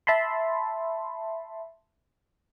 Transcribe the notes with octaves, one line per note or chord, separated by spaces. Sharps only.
E5 A5 B5 C6